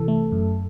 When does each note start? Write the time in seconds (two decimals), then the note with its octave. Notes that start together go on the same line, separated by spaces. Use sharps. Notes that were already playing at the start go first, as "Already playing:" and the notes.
Already playing: C3 E3 A4
0.08 A3
0.32 F#2